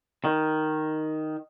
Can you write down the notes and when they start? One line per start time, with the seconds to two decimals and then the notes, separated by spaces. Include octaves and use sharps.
0.24 D#3